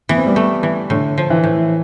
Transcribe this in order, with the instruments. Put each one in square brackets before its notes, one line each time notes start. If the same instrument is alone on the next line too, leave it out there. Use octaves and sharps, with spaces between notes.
[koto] E3 [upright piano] B3
[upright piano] C4
G3 B3
[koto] A3
E3
[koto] A2 [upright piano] D3
[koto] F3
[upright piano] E3
[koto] A2